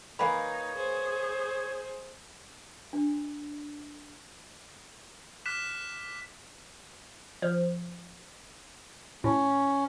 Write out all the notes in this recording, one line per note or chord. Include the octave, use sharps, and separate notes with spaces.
A#3 D#4 B4 C#5 G#5 B5
G#4 C5
D4
D6 F6 F#6 B6 E7
F3
A2 C#4